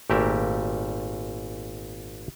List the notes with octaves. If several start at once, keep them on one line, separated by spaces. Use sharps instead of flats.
G#1 A#2 A3 G4 A#4 E5